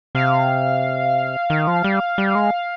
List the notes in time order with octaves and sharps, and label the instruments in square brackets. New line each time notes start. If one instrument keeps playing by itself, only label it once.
[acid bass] C3 [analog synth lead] F5
[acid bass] D#3
F3
G3
G3
G#3